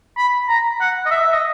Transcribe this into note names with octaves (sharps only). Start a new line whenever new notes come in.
B5
A#5
F#5
D#5
E5
E5
D#5